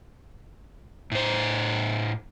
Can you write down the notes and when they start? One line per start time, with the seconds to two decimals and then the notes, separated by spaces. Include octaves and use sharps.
1.11 A2 C5